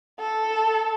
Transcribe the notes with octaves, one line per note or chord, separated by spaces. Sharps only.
A4